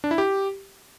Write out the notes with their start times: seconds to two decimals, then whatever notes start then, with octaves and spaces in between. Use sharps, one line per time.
0.04 D4
0.11 E4
0.18 G4